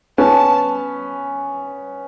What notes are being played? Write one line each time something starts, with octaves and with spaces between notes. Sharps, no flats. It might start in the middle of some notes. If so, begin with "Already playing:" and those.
B3 C#4 A5